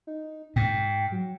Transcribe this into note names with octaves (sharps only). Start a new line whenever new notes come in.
D#4
G#2 G5
F#3